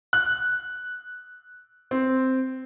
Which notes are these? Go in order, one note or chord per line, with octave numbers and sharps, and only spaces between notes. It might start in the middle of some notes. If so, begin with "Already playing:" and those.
F#6
C4